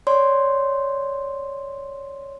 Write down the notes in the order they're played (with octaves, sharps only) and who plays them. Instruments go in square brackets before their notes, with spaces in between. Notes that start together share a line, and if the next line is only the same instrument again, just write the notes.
[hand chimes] C#5 D5 C6